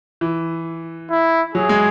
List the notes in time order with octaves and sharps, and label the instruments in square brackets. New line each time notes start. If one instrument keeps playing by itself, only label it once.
[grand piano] E3
[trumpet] E4
[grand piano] F#3 [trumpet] G#4
[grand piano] G#3